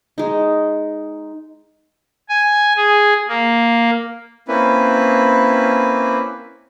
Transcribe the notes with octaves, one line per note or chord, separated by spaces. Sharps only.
G#3 D#4
G#5
G#4
A#3
A#3 C4 C#4 E4 B4